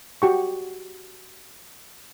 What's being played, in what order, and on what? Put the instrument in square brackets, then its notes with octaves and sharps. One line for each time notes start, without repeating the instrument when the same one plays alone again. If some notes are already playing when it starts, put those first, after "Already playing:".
[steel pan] F#4 G4 C#6